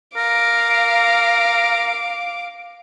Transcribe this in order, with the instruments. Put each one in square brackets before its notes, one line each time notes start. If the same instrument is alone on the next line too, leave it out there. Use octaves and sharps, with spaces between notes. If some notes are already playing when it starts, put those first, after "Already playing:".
[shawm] A#4 [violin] F5 D6